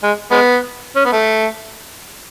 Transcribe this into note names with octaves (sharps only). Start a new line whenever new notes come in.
G#3
G#3 B3
C#4
B3
A3